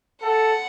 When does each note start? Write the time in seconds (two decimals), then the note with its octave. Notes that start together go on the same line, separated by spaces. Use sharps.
0.22 A4 F#5